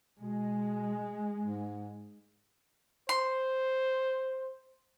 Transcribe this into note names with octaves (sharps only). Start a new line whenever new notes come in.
B2 G#3
G#2
C5 C6